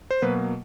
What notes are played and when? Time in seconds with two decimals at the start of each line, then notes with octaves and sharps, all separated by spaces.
0.11 C5
0.22 B2 F#3 A#3 B4